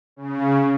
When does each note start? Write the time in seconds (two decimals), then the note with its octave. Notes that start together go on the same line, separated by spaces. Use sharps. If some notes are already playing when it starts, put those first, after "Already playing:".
0.16 C#3